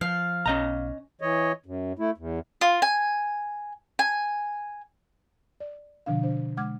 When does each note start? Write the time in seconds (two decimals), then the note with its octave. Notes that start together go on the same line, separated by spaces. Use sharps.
0.01 F3 F5
0.46 B1 C#4 D#5 A#5
1.21 E3 C#5 D#5
1.66 F#2
1.99 A3 E4
2.18 E2
2.61 F4
2.82 G#5
3.99 G#5
5.60 D5
6.06 B2 D3 F3 D4 F5
6.23 D4 C5
6.57 G#3 F#5 D6 F6 G#6